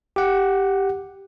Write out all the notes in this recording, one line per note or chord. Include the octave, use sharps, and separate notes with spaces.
G4 F#5